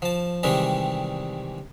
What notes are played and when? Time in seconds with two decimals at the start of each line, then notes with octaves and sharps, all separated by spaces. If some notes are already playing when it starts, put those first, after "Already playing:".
0.02 F3 A5
0.43 C3 D#3 E3 G3 G#3 G4